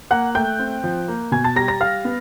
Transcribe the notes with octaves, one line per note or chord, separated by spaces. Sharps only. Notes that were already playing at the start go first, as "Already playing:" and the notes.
A#3 F#5 F#6
A3 G5 G6
C4
F3
A#3
B2 G#5 G#6
A5 A6
G3 A#5 A#6
A#5 A#6
G3 F5 F6
B3